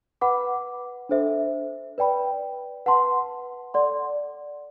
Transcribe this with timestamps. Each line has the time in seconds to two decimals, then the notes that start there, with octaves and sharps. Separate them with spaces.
0.21 B4 F#5 B5 D6
1.09 D4 A4 C5 E5
1.98 B4 D5 G5 B5
2.86 B4 F#5 A5 C6
3.74 A4 D5 F#5 C6